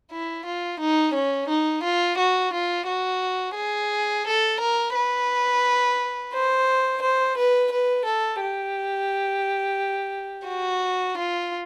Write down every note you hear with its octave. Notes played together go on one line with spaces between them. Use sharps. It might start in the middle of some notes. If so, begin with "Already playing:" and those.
E4
F4
D#4
C#4
D#4
F4
F#4
F4
F#4
G#4
A4
A#4
B4
C5
C5
B4
B4
A4
G4
F#4
F4